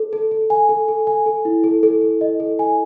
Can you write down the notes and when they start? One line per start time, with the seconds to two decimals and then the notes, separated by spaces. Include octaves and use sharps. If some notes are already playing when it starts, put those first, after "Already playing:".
Already playing: A4
0.13 A4
0.31 A4
0.50 G#5
0.69 A4
0.88 A4
1.07 G#5
1.26 A4
1.45 E4
1.64 A4
1.83 A4
2.01 A4
2.21 D#5
2.40 A4
2.59 G#5